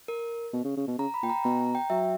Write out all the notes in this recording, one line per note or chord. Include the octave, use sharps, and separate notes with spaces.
A#4
B2
C#3
C#3
B2
C#3 A#5
B5
A#2 G5
A#5
B2 A#5
A#5
G5
F#3 E5